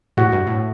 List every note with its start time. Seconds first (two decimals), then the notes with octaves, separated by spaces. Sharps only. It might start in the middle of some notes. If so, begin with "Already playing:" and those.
0.17 A2 F#4
0.32 G2
0.47 A2